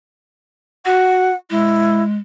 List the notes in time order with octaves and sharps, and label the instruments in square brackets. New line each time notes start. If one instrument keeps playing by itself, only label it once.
[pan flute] F#4 [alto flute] F#5
[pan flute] G#3 [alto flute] E4